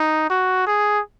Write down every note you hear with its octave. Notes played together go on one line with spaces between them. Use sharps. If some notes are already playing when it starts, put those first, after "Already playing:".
Already playing: D#4
F#4
G#4